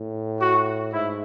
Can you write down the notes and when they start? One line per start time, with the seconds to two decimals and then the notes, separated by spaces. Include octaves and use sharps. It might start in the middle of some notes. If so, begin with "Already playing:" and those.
Already playing: A2
0.41 F#4
0.93 G#2 E4